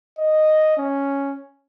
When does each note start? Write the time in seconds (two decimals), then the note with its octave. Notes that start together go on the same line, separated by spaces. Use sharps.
0.19 D#5
0.77 C#4